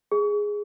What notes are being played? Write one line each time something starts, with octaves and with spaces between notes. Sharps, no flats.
G#4